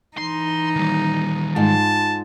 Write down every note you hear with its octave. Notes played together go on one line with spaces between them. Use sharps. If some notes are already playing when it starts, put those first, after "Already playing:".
E3 D#4 C6
D#3 G3
G#2 F4 A5